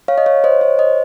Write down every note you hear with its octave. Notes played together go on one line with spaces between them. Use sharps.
C#5 F5
D#5
C#5
C5 D#5
C#5
C5 D#5